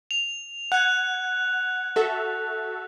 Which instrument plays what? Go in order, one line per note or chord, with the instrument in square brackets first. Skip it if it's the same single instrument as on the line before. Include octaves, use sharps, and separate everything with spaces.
[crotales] F7
[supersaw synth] F#5 G#6 [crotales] F#6
[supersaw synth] F#4 A4 E5